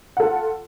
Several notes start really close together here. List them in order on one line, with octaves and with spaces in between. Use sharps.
F#5 A4 F4